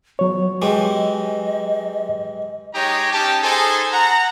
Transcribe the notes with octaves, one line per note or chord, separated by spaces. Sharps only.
F#3 B3 C#5
E3 G#3 G4 D#5
G#3 D#4 G4 C#5 A#5
C#4 D#4 G4 A5
D#4 G#4 A4 C5 G#5
F#5 A#5